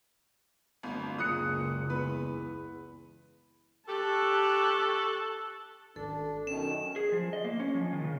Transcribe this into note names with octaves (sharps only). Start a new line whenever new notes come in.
D1 G1
F#1 C#2 A#2 D#6 F#6 C#7
E2 B4
G4 A4 A5 C#6 F#6
G#1 D4 A4
F#2 B2 D#3 C#4 E7
G#4
F3
D#5
A#3
C#4
F3
D#3
C#3